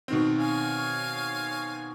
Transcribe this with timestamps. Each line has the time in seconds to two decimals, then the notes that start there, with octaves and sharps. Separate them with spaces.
0.08 B2 D#3 C4
0.38 C#5 F5 G#5